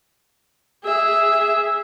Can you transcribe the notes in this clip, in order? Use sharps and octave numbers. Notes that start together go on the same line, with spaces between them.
G#4 E5